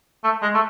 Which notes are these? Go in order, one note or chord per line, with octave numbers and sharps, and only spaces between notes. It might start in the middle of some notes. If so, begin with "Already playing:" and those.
A3
G#3
A3